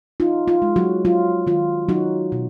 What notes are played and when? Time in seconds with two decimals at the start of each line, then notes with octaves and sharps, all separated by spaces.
0.20 D#4 F4
0.48 F4
0.62 G#3
0.76 F#3 F#4
1.05 F#3 F4
1.47 D#3 F4
1.89 F#3 D#4 F#4
2.32 B2